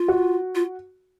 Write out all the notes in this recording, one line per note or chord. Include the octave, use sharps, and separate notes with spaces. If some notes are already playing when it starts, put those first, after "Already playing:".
Already playing: F4
F#4
F4